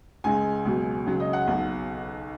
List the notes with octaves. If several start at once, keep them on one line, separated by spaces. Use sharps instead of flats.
C#2 C#3 G#3 G#5
C#2 B2 F#3
C#2 C#3 F#3
D#5
F#5
B1 B2 F#3